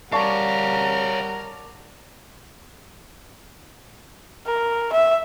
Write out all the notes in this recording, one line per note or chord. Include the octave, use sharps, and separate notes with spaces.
G3 A#4 C#5 D5 F5 F#5 A5 C#6
A#4
E5